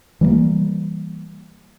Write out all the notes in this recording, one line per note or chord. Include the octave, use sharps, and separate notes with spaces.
E3 G3 G#3 A#3